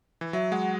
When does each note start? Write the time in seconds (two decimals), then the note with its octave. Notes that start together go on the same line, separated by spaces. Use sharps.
0.21 E3
0.33 F#3 E5
0.52 G#3 F#5